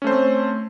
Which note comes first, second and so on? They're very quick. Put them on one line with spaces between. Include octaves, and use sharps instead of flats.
C#4 A3 C5 C4